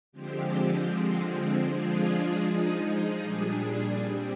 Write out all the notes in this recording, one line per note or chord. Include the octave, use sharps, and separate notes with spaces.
D3 F3 G#3 C4 G4
D3 F3 G#3 C4
F3 G#3 D4 F4 G#4
F3 G#3 D#4 G#4
A#2 G3 D4 G#4
G3 C4 G4